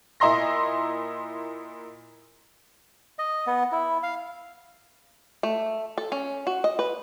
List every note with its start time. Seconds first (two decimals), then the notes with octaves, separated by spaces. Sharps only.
0.20 A#2 E4 D#5 A#5 C6 A#6
3.19 D#5
3.47 B3
3.72 E4
4.03 F5
5.43 A3
5.98 A4
6.12 C#4
6.47 F#4
6.64 D#5
6.79 B4